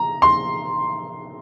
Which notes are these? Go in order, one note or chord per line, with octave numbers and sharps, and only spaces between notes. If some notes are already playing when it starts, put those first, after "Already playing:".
Already playing: A#5
C6